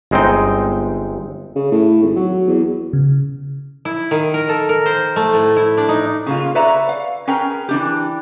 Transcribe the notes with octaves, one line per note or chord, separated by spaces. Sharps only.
G1 G#3 C4 D#4 G5
C#3
A2
G#1
F#3
E2
C#3
E4
D#3
A#4
A4
A#4
C5
A3
A2
E4
D4
D#4
C#3 A#3 F4
B4 C#5 D5 E5 A#5
F5
C#4 G#4 A#4 B4 G5 A#5
E3 D4 G4